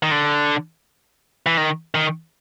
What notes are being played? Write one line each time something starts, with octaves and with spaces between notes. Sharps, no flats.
D#3
D3
E3
D#3
D#3